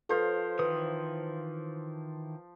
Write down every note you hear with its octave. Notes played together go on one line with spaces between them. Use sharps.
F3 A4 B4 C5 F5
D#3 E3 B4 D#6